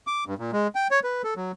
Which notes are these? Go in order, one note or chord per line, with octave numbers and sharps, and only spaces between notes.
D6
G2
A#2
G#3
G5
C#5
B4
A4
F#3